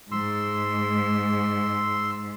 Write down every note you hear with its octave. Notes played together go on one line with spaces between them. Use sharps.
G#2 C6 E6